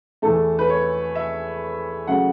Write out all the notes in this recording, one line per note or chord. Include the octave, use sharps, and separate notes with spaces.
E2 E3 A3 A4
B4
C#5
E5
C#3 F#3 A3 F#5